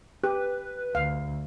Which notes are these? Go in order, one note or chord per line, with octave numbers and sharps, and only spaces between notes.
G4 B4
D2 F5